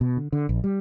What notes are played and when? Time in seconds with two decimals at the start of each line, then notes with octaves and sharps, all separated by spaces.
0.01 B2
0.17 D3
0.32 D3
0.49 A#1
0.64 G3